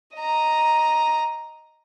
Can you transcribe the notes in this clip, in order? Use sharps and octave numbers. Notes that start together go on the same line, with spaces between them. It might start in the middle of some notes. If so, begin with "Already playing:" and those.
D#5 A#5